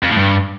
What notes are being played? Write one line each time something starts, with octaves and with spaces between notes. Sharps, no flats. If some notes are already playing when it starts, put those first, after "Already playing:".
F2
A2
G2